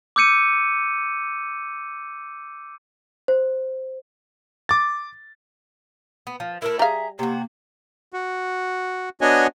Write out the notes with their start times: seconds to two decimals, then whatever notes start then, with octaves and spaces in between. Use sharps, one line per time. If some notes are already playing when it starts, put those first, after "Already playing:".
0.16 D6 E6 G6 C#7 D#7
3.28 C5
4.69 D6 A6
6.27 B3
6.40 F3
6.62 A3 E4 A#4
6.79 G3 G#4 E5 F5 A#5
7.19 C3 A#3 F#4
8.13 F#4
9.21 B3 D4 F#4 C#5 D#5 G#5